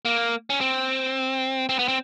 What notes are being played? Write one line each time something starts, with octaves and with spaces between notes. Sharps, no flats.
A#3
C#4
C4
C4
B3
C4